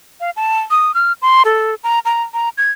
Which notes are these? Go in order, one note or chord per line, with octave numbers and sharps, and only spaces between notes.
F5
A5
D#6
F6
C6
A4
A#5
A#5
A#5
G#6